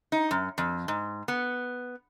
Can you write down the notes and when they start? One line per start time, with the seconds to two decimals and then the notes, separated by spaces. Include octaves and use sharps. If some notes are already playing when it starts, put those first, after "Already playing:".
0.12 D#4
0.31 F#2
0.58 F2
0.88 G#2
1.28 B3